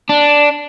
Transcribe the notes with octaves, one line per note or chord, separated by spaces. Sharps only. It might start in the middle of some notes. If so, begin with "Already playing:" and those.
D4